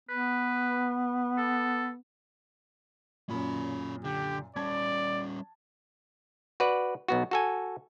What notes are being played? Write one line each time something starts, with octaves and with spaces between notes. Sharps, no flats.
B3 B4
A4
F#2 A#2 C#4 B5
D3 G4
G3 C#4 D5 A5 G#6
F#4 B4 D5
B1 B3 F#4
F#4 A4 G#5